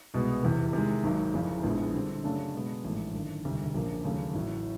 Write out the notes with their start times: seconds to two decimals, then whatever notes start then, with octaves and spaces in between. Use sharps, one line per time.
0.14 C2 B2 G#3 B3
0.43 F1 E2 C3 E3
0.73 C3 D#3 G#3
1.04 G#1 G#2 D#3 F#3
1.34 F#1 F2 C#3 E3
1.63 A#1 A2 F3 G#3 B3
1.94 D3 G3 C4
2.24 F#2 C#3 F#3 A3 D4
2.54 B2 G#3 B3
2.84 A1 G#2 F3 A3
3.13 G#1 F#2 D3
3.44 E1 D2 C3 D#3 G3
3.74 A#1 A#2 F3 A#3 C#4
4.04 D#2 C#3 F#3 A3
4.34 A1 A2 F#3